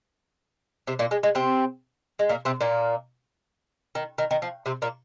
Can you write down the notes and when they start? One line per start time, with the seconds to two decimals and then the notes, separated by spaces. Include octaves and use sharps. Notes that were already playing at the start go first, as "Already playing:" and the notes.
0.87 C3 C4
0.99 A#2 A#3
1.11 G#3
1.23 G#3
1.35 C3 C4
2.19 G#3
2.29 A#2 A#3
2.45 C3 C4
2.61 A#2 A#3
3.95 D#3
4.18 D#3
4.31 D#3
4.42 F3
4.66 C3 C4
4.82 A#2 A#3